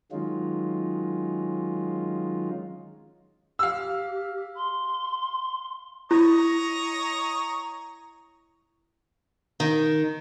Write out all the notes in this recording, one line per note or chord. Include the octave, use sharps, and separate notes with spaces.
D#3 F#3 G#3 C#4 D#4 F4
G4 F5 E6
C6
E4 C#5 D#5 A#5
D#3